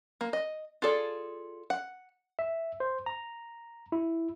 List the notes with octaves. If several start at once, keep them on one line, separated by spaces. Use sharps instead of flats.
A#3
D#5
F4 G#4 A4 D5
F#5
E5
C5
A#5
E4